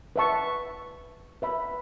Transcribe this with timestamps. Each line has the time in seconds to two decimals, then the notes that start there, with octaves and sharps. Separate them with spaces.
0.16 B4 E5 A5 C#6
1.42 B4 E5 B5